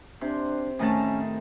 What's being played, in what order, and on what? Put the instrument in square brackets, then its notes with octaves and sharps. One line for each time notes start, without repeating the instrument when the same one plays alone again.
[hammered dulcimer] C3 [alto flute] D4
[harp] A2 D#3 A3 [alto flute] C#4 [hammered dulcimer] G#4 A#4 A5